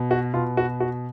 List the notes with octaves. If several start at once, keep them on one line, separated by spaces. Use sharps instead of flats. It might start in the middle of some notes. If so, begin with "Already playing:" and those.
Already playing: B2
F#4
B2 F4
F#4
F#4